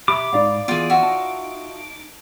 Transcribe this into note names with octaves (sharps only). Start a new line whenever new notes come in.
G4 E5 B5 D6
G#2 D#4 D5 F5
E3 B3 F4 G#4 D7
F4 F#4 E5
D#4 A5